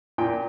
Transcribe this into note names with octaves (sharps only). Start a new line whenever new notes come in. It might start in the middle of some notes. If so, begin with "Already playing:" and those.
A#2 G5